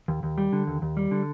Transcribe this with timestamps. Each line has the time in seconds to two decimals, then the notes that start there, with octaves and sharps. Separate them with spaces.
0.08 D#2
0.23 D#2
0.38 G3
0.53 D3
0.68 D#2
0.82 D#2
0.97 G3
1.11 D3